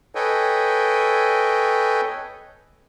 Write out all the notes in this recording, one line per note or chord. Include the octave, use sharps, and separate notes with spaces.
A4 B4 C#5 D#5 G5 G#5